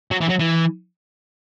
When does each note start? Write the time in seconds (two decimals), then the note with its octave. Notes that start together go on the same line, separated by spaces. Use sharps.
0.11 F#3
0.21 E3
0.30 F#3
0.40 E3